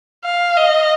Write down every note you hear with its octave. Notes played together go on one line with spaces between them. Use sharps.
F5
D#5